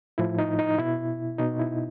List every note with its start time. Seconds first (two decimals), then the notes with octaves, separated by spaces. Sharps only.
0.18 A2 F3 E4
0.39 D#4
0.59 D#4
0.78 B2 E4
1.38 B2 D#4
1.60 E4